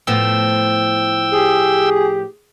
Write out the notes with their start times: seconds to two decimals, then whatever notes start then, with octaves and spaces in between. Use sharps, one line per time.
0.07 A2 F3 B3 G5 E6
1.31 G4 G#4